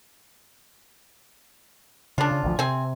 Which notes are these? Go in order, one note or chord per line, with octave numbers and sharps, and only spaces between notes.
C#3 D4 F4
C#3
A1 D2 F3
C3 C4 G#5